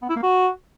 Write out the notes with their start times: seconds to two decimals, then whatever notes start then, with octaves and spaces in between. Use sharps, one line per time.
0.02 B3
0.09 E4
0.16 A#3
0.23 F#4